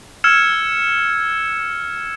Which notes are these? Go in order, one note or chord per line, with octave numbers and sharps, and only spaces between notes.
E6 F6 G#6 C#7 E7